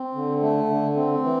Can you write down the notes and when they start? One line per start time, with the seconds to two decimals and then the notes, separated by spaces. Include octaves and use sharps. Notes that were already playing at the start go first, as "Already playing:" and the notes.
Already playing: C4
0.15 D3
0.42 A3
0.70 D3
0.96 C4
1.23 E3